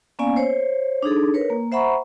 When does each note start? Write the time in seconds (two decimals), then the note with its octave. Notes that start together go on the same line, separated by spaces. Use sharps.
0.19 A#3 B3 C#4 D5 F5 G#5
0.36 C5 C#5
1.03 D4 D#4 G#4 A4
1.34 A#4 B4 C#5
1.50 A#3
1.72 C5 E5 F#5 A#5 B5 C#6